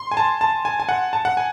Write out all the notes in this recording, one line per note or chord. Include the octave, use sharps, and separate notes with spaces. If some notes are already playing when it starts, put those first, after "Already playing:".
Already playing: C6
G#5
A5
A5
G#5
G#5
F#5
A5
F#5
G#5